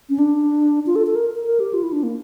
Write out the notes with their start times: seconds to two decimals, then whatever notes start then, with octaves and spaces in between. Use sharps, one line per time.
0.10 C#4
0.19 D4
0.87 F4
0.96 A4
1.07 A4
1.15 A#4
1.35 A#4
1.45 A#4
1.60 G4
1.73 F4
1.83 E4
1.92 D4
2.03 A#3